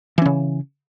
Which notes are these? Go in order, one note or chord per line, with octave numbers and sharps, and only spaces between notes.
C#3 E3 C#4